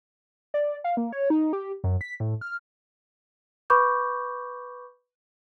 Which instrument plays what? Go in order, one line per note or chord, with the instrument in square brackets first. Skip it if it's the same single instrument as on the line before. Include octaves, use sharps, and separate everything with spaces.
[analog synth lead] D5
F5
A#3
C#5
D#4
G4
F#2
B6
A2
F6
[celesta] B4 B5 C#6 D6 G6